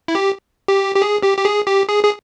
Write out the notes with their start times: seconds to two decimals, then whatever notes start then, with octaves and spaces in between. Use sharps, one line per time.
0.08 E4
0.15 G4
0.68 G4
0.96 G4
1.02 G#4
1.23 G4
1.38 G4
1.45 G#4
1.67 G4
1.89 G#4
2.04 G#4